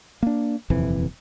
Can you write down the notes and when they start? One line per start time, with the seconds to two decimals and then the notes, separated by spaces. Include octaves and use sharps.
0.23 A#3 D4
0.70 D#1 F2 C3 E3